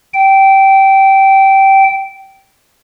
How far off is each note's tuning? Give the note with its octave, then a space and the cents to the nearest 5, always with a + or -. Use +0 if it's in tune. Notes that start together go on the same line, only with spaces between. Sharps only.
G5 -15